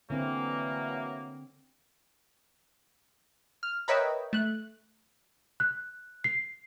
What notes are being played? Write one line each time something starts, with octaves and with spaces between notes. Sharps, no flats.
D3 E3 F#3 A#3 C4
F6
A#4 B4 C#5 D#5 E5 G5
A3 F#6
F#6
C7